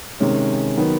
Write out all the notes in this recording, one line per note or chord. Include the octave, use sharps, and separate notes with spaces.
C3 D#3 G#3 C#4
D#3 F#3 B3